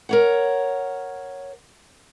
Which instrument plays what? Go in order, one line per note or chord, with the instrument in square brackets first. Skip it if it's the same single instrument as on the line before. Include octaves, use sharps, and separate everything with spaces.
[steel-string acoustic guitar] A#4 C#5 F#5